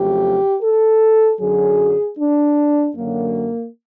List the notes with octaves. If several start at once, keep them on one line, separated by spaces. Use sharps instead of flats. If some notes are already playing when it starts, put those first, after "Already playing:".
Already playing: F2 C#3 F#3 A3 G4
A4
F#2 D3 F#3 G#4
D4
F#2 D3 F#3 A#3